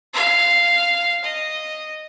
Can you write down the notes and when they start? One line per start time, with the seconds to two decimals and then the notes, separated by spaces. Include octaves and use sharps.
0.14 F5
1.25 D#5